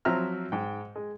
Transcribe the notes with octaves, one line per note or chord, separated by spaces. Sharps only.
F3 F#3 C4 E5 A#5 F6
G#2 G5
G#3